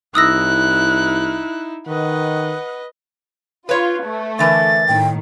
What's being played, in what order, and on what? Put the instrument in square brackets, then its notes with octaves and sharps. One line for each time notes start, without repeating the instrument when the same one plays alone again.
[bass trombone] C2 [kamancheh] D#4 E4 [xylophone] D#6 E6 A#6 [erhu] F#6
[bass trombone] D#3 [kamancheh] B4 D#5 [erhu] F#5
[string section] F4 [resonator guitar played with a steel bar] B4 C#5
[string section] A3
[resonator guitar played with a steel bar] D3 E3 A#4 [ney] E5 [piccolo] A6
[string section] A2 D#3 [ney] G5